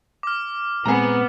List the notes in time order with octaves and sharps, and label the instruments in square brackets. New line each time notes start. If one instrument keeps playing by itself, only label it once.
[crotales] D6 F6
[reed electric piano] A#2 G#3 C4 [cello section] B3 [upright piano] G#4 A#5